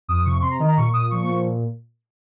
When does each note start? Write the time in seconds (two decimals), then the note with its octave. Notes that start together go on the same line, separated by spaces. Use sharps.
0.08 F2 D#6
0.25 C3 C#6
0.42 C3 C6
0.51 A#5
0.60 D#3 D#5
0.68 A#5
0.77 A#2 C#6
0.93 A#2 D#6
1.11 F3 C#6
1.27 A#2